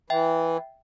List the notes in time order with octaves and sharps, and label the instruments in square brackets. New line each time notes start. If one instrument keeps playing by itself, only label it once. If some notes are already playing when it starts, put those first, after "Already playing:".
[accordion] E3 [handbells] E5 G5